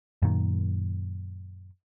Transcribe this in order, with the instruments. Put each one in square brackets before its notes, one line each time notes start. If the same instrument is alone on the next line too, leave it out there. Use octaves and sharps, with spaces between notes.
[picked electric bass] F#2 A#2 D#3